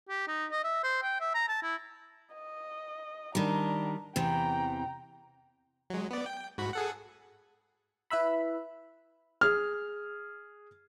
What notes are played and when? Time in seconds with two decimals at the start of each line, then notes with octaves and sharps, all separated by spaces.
0.09 G4
0.27 D#4
0.51 D#5
0.64 E5
0.84 C5
1.03 G5
1.21 E5
1.35 A#5
1.48 A5
1.63 E4
2.33 D#5
3.35 D#3 G3 D4 A#5
4.16 E2 C3 E3 G5 A#5
5.90 F#3 G#3
6.11 B3 D5
6.26 G5
6.58 G#2 F#4 B5
6.73 G#4 A4 F#5
8.10 E4 B4 E5 B5
9.41 G#4 F6